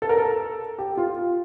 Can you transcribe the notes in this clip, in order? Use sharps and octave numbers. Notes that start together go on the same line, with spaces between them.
A4
A#4
A4
G4
F4